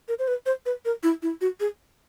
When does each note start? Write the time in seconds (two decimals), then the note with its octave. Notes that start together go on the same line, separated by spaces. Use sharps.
0.08 A#4
0.19 C5
0.28 B4
0.46 C5
0.66 B4
0.85 A#4
1.03 E4
1.22 E4
1.41 F#4
1.60 G#4